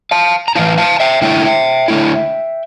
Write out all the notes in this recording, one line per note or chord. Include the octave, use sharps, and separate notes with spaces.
F5 A5
A#5
A2 E3 A3 E4 F5 A5
F5 A5
E5 G5
D3 A3 E4 E5 G5
D3 A3 E4